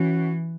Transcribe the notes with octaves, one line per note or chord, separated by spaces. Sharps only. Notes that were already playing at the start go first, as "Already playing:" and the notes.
Already playing: E3 C#4 F#4